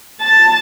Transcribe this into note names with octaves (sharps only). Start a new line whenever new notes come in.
A5